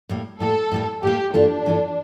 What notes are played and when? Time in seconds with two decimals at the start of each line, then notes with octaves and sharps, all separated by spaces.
0.09 A2 G3 A#3
0.40 A2 G3 A#3 A4
0.72 A2 G3 A#3
1.03 A2 G3 A#3 G4
1.34 G2 E3 A#3 D4 F4 A4
1.65 G2 E3 A#3 F4 A4